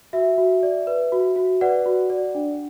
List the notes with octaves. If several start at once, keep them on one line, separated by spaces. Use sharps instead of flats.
F#4 E5
F#4
D5
B4
F#4
F#4
B4 D5 F#5
F#4
D5
D4